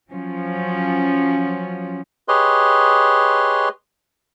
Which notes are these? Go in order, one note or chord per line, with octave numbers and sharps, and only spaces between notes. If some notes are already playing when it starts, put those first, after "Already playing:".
F3 F#3 C#4
G4 G#4 B4 C#5 D#5 C6